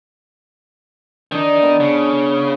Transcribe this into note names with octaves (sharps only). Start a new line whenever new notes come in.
D#3 D4 D#4
B3 A5
C#3